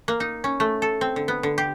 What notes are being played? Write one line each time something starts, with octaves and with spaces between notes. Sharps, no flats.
A#3
D#4
C#4
A3
A4
C4
D3
B3
D3
G4